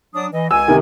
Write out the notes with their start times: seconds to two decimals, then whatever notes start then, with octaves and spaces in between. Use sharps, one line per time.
0.15 F#3 D4 D#6
0.33 E3 D#5
0.51 C#2 G#5 E6
0.68 C3 D#3